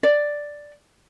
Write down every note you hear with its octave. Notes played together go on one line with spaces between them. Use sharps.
D5